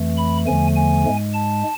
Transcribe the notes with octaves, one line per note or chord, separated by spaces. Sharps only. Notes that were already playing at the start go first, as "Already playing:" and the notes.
Already playing: F2 E3 A3
B5
E2 D3 F3 A3 G#5
G#5
G#2 G#3
A5